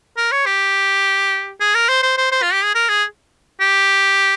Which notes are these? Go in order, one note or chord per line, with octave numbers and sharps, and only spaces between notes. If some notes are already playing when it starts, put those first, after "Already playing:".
A#4
C#5
G4
G#4
A#4
C5
C5
C5
C5
F4
G4
G#4
A#4
G#4
G4